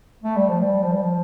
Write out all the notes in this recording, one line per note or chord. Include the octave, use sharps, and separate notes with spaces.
A3
G3
F3
G3
F3
G3
F3